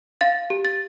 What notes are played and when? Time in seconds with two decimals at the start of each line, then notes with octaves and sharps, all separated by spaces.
0.21 F5 A6
0.50 G4
0.65 A6